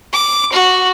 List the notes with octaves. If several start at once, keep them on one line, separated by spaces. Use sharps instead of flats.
D6
F#4